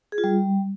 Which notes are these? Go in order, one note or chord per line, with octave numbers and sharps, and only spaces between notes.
G#4
F4
G3